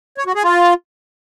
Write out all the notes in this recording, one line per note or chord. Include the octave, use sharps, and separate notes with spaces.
C#5
F#4
G#4
F4